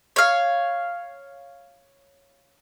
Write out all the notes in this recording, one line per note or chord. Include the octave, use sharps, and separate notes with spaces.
C#5 F5